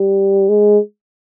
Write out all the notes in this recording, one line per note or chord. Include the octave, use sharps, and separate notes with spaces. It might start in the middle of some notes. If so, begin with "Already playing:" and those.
Already playing: G3
G#3